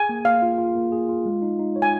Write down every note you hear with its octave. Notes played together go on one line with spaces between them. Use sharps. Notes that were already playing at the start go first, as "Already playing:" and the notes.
Already playing: G#4 G#5
A#3
A#3 F5
F4
F4
A#3
G#4
F4
G#3
D#4
D#4
C#5
G#5